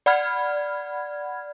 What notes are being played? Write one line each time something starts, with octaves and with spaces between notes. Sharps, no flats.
D5 F#5 B5 F6 G#6